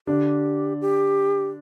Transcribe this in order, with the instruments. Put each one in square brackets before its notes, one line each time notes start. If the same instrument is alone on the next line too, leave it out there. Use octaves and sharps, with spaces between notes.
[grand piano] D3 D4 [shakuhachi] G4
[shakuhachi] G4